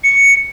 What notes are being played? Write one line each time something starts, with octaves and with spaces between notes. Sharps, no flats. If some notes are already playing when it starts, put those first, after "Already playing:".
C#7